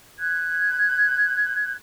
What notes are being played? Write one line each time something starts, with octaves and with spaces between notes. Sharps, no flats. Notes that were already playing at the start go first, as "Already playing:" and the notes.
F#6 G#6